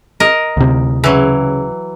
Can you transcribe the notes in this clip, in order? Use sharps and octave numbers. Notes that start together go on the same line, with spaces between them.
A#4 D#5
D2 C3
C#3 E3 F#3